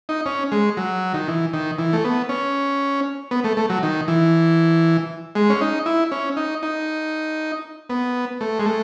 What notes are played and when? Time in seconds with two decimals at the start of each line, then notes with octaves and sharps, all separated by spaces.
0.09 D#4
0.26 C#4
0.52 G#3
0.77 F#3
1.14 D#3
1.28 E3
1.53 D#3
1.79 E3
1.93 A3
2.04 B3
2.29 C#4
3.31 B3
3.44 A3
3.57 A3
3.70 F#3
3.83 D#3
4.08 E3
5.35 G#3
5.50 C#4
5.61 D#4
5.86 E4
6.12 C#4
6.37 D#4
6.63 D#4
7.90 B3
8.41 A3
8.59 G#3
8.66 A3